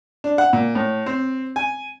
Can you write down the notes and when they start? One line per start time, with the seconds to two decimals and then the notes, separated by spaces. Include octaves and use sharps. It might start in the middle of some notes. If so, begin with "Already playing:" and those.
0.24 D4
0.38 F#5
0.53 A#2
0.75 A2
1.06 C4
1.56 G#5